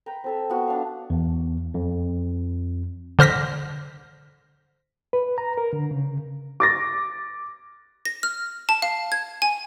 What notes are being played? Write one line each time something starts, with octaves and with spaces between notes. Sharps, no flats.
B4 G5 A#5
C4 A4 E5
B3 F#4
D4 F5
E2
F2
D3 C5 F6 A#6 B6
B4
A#5
A#4
D3
C#3
D6 A6 A#6
A#6
F6
A5
F5
G#6
G#5